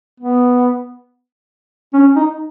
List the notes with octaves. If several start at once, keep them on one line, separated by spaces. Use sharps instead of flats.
B3
C#4
D#4